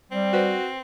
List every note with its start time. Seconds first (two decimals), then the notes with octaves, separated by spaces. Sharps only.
0.12 G3 C4
0.33 F#4 B4 C5